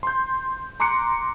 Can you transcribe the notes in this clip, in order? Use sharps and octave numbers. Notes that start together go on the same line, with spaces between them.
C6 G6
A#5 C6 D6 F#6 C#7